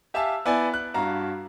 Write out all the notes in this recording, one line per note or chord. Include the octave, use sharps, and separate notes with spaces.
G4 E5 F5 G#5 A5 E6
B3 E4 D5 G#5
F#6
G2 F#4 F5 A#5